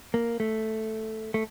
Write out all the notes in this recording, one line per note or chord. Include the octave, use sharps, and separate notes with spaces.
A#3
A3
A3